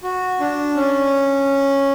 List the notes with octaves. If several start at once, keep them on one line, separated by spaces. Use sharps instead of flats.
F#4
D4
C#4